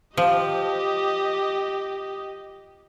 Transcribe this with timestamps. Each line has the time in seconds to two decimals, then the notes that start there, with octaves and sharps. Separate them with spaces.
0.17 F3 G4 D#5